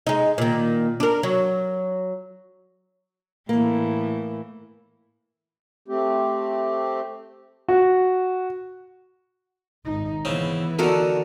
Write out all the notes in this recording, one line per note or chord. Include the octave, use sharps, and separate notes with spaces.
G#3 D#4
A#2 D#3
D4 A#4
F#3
A2 E3 A#3
A3 C4 G4
F#4
G#1 D#4
C#3 E3 B3 C4
D3 D#3 F#4 A4 A#4